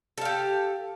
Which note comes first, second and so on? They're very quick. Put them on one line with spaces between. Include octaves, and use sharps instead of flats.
A4 F5 G4